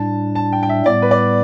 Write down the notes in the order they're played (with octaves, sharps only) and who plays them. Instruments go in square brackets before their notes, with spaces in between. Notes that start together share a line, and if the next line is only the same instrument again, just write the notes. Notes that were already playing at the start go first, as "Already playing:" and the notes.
Already playing: [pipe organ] A2 G3 D4 [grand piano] A5
[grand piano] A5
G5
G5
E5
[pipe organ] A2 G3 B3 [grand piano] D5
[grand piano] B4
D5